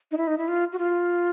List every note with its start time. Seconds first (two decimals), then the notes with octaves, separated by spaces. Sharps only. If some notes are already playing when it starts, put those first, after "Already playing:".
0.12 D#4
0.17 E4
0.27 D#4
0.38 E4
0.48 F4
0.72 F#4
0.79 F4